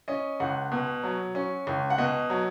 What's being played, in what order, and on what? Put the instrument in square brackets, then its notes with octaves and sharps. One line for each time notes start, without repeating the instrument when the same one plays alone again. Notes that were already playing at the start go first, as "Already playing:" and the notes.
[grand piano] C#4 D#5
C#2 F#5
B2
F#3
C#4
C#2
F#5
B2 D#5
F#3